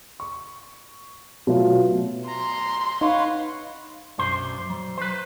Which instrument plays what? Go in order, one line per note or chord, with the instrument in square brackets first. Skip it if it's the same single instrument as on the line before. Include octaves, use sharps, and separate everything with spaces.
[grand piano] C#6
B2 F#3 A3 F4
[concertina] A#5 [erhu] C6
[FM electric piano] D#4 [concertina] B4 C#5 F#5 [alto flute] F5
[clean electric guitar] B1 F#2 D4 C5 C6
F#3
B4 C5